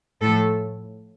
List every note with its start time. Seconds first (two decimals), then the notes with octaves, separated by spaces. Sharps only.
0.21 A2 F3 A4